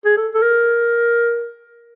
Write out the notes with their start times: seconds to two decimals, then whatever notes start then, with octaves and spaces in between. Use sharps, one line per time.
0.05 G#4
0.17 A4
0.34 A4
0.42 A#4